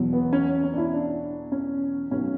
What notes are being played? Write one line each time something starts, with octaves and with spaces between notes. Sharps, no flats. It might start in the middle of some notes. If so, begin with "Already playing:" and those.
Already playing: E2 B2 F#3
B3
C#4
C#4
D4
E4
D4
C#4
B1 B2 F#3 C#4